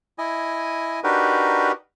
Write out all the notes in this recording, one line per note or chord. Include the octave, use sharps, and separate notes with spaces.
E4 D#5 G#5
D4 D#4 F#4 G4 A#4 B4